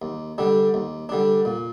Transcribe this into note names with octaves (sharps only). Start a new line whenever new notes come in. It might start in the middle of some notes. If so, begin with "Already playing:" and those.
D#2
D3 G3 D4
D#2
D3 G3 D4
A#2